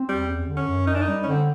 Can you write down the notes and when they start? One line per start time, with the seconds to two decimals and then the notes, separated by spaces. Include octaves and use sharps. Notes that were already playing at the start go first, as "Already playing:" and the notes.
Already playing: C4
0.09 E2 G3
0.27 F#2
0.48 D3
0.57 C#4
0.67 F#2
0.87 F#2 D#4
0.95 D4
1.01 G3 D#4
1.24 C#4
1.27 D3 C4